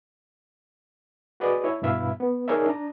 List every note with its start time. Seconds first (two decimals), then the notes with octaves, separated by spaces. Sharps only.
1.40 F#4 G#4 B4 D5 D#5
1.64 E4 C#5
1.82 G2 B2 E4 E5 F5 B5
2.20 B3
2.48 D#4 G#4 A#4 C#5 D5 E5
2.66 D4 A#5